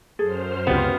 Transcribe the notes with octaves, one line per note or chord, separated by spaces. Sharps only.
F#2 G#4 A4 C5 F6
C#2 C3 B3 F4 G4